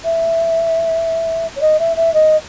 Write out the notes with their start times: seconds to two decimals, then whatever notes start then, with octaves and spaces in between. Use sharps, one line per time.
0.04 E5
1.56 C#5
1.61 D#5
1.79 E5
1.96 E5
2.13 D#5